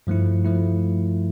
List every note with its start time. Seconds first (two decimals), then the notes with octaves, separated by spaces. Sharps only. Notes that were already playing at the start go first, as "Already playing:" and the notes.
0.07 G2 F3 A3 E4
0.44 F3 A3 E4